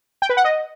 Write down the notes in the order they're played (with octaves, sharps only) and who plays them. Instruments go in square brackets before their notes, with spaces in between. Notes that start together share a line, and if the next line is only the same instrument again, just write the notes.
[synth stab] G5
B4
F#5
D#5